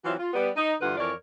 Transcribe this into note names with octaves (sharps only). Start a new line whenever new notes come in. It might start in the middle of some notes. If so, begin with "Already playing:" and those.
E3 F#3 C4 F4 F#4 E5
F4
G3 B3
D#4
G2 D3 E3 F4 B4 F#5
F2 E3 A#4 C#5 D5